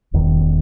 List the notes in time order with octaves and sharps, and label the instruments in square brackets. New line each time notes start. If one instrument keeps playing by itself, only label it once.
[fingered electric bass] E1 E2 D#3